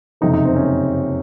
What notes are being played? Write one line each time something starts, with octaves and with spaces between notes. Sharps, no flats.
F#1 F2 C3 F3 D#4
D#4
C4
C#4